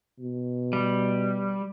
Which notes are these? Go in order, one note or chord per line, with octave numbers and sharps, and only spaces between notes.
B2
G3